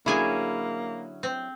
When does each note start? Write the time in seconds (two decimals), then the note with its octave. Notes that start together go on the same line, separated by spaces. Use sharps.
0.06 D3 F#3 A#3 C#4 E4 G#4 G#5
1.23 C4